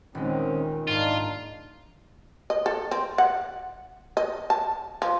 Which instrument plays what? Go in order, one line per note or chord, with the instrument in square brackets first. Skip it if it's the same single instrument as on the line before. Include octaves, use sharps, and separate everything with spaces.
[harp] D#1 G#3 [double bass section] D#3 [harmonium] C4 C#4
[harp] G#2 [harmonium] D4 D#4 [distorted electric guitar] F4
[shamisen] D#5
A4
C4
F#5
D#5
A5
F3